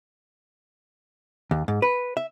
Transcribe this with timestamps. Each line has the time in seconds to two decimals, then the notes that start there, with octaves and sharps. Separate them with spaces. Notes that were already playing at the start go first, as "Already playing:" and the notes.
1.51 D#2
1.68 G#2
1.82 B4
2.17 E5